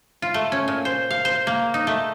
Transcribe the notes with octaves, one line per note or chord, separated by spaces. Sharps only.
F4
A3
C#4
A#2
C5
F5
C5
A#3
D#4
A3